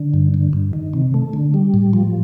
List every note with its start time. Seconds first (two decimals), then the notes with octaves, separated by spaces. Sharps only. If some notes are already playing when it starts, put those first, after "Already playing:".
Already playing: D3
0.14 G2
0.34 D3
0.53 G2
0.73 D#3
0.93 C3
1.14 A3
1.33 D3
1.54 G3
1.74 A2
1.93 F3